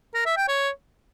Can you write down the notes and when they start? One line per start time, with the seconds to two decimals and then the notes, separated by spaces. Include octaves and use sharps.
0.14 A#4
0.26 E5
0.37 G5
0.48 C#5